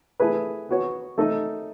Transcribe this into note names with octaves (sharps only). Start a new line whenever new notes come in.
A3 E4 G#4 B4
B3 F#4 C#5
A3 D#4 A4 D#5